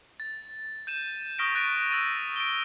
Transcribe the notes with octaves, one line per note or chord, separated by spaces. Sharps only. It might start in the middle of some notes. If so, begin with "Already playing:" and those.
A6
G6 D#7 E7
C#6 D#6 F6 A#6 B6 D7
C#6 F#6 A6 B6 D7 D#7
E6 A6 D#7
D7 G7